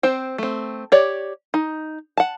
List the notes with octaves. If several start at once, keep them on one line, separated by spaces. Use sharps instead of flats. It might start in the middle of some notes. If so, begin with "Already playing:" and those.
C4 C5 G5
A3 C4
G4 C#5 D5
D#4
F#5 A5